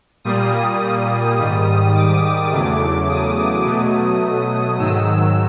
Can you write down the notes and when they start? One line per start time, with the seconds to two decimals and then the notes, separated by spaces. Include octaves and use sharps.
0.24 A#2 G3 A#3 D#6
0.82 D#6
1.39 G#2 D#3 G3
1.95 D6
2.52 E2 C#3 F#3 A3
3.09 D#6
3.66 B2 F#3 A3
4.79 G#2 D#3 F#3 E6